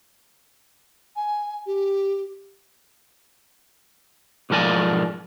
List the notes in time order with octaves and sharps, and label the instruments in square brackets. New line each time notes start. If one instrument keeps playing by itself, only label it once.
[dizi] G#5
G4
[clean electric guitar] B1 G#2 F3 A#4 D5 G#5